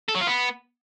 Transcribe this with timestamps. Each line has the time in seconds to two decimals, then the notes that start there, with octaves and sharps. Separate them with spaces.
0.08 A4
0.15 F#3
0.21 F4
0.27 B3